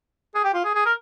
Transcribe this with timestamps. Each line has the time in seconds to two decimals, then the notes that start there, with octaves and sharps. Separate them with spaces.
0.35 G#4
0.44 G4
0.54 F4
0.64 G#4
0.75 G#4
0.86 A#4